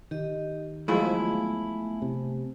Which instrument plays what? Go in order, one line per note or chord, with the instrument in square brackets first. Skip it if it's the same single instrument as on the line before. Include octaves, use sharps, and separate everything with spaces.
[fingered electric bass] D#3 [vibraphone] G4 D#5
[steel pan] F3 F#3 G#3 [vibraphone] A3 B3 G#5 [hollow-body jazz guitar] E4 F4
[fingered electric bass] C3